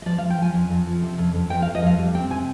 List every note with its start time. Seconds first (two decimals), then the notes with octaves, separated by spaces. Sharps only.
0.02 D#5
0.06 F3 D5
0.18 F5
0.22 F3
0.30 G5
0.38 F3 G#5
0.54 F2
0.70 F2
0.86 F3
1.02 C3
1.18 F2
1.35 F2
1.50 F2 G5
1.62 F5
1.67 F2
1.75 D#5
1.83 F2 F5
1.99 G3
2.15 C4 G5
2.31 C3 G#5